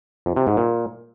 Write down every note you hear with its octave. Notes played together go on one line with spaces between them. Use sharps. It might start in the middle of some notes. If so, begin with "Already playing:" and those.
F2
C3
G#2
A#2